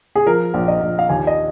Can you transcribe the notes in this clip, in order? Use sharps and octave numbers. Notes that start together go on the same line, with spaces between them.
G#4
F3 A#4
A#1
D#5
A#1
F5
D#2 G#5
D#5